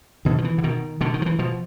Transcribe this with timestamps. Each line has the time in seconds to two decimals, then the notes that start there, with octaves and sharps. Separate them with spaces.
0.25 B2 D#3
0.38 F3
0.44 E3
0.58 D3
0.64 B2 D#3
1.01 B2 D3
1.14 D#3
1.22 F3
1.26 E3
1.39 B2 F3